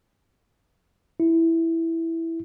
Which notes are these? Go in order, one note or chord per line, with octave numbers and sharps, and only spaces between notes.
E4